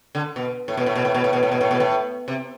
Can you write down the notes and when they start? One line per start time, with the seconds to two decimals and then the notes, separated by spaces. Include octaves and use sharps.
0.15 D3
0.36 B2
0.68 A2
0.77 B2
0.86 A2
0.95 B2
1.05 A2
1.14 B2
1.24 A2
1.33 B2
1.43 A2
1.51 B2
1.61 A2
1.71 B2
1.80 A2
2.28 C3